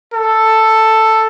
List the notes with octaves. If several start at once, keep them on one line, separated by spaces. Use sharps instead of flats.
A4